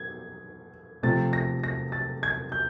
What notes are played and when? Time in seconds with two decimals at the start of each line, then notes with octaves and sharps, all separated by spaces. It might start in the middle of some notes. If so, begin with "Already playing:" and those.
Already playing: G#6
1.03 C3 F3 A3 A6
1.33 A#6
1.64 A#6
1.92 A6
2.23 G#6
2.52 G6